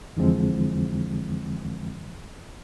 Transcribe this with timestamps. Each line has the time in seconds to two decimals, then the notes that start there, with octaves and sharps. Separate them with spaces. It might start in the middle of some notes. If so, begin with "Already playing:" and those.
0.17 F2 D3 E3 F3 G#3 C4